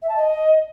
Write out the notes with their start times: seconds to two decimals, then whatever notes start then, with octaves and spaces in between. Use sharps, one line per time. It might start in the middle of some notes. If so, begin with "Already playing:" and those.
0.02 E5
0.09 A5
0.16 D#5